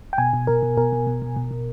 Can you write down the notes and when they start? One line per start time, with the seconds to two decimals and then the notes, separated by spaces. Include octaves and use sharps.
0.13 G5
0.18 B2 G#5
0.33 B2
0.47 B2 A#4
0.63 B2
0.77 B2 A#4
0.93 B2
1.07 B2
1.22 B2
1.36 B2
1.51 B2